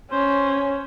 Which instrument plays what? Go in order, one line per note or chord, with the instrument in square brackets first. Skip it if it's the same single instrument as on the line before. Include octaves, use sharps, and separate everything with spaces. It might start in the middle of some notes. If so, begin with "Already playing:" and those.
[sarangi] C#4 [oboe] C5